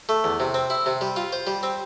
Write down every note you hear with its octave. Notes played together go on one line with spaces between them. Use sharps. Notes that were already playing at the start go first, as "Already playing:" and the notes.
A3
E2
C3
C4
E4
C3
G3
F4
C5
G3
C4